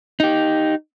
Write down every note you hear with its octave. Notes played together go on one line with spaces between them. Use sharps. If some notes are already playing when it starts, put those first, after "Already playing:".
D#4 G4